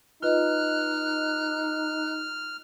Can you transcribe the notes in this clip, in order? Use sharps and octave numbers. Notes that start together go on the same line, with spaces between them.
D#4 F4 B4 D#5 F6 F#6